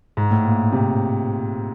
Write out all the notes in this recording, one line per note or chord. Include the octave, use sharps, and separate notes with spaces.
G#2
A2
A#2
C3